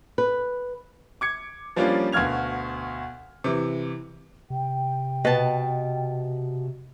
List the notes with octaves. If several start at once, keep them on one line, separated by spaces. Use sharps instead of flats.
B4
D6 G#6 C#7
F3 G3 A#3 C#4 D4 F4
D2 B2 F5 F6 G#6 F7
C3 E3
C3 G5
B2 B4 D#5 A5